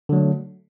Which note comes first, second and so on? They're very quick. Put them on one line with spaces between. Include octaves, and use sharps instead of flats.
D3 F#3 A3